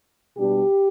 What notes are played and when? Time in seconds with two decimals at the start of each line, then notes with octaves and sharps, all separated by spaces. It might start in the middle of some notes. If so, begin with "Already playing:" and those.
0.37 B2 G3 D4 G4